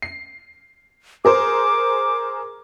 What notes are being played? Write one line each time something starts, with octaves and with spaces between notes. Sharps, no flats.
C7
G#4 A#4 C5 D6